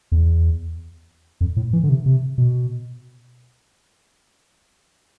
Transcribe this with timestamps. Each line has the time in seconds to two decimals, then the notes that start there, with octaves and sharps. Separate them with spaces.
0.12 E2
1.41 F2
1.56 A2
1.73 E3
1.83 D3
1.89 C3
2.06 C3
2.38 B2